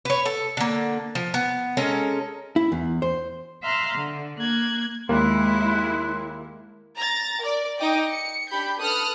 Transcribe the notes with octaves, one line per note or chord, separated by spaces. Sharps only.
B4 C#5
A4
D3 A#3
F3
B3
G#3 C#4 A4 A#4
E4
E2
C5
E5 F5 A#5 C6 F6 F#6
D3
A#3 F#6 G#6
D#2 G#3 A#3 E4 C6 F#6
A#5 A6
A#4 D5
D#4 D#5 G5 D6
C#7
D4 G4 B5 G6
A4 B4 D#6 F6 F#6